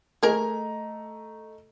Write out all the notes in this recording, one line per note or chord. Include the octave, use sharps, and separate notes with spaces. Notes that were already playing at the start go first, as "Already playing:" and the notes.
A3 G#4 A#4 D#5 A#5